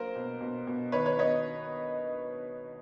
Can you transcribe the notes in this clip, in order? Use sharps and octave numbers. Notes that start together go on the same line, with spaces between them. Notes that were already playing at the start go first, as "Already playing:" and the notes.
Already playing: F#3 A#3 A#4 C5
B2
B2
B2
D#3 B4 C#5
B4 C#5
B3 C#5 D#5